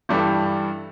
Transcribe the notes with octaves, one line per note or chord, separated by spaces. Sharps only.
G2 E3 G3 D4 A4